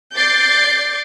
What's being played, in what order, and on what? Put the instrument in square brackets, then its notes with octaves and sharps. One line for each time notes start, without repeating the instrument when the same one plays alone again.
[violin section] D5 D6 G6 A6 C7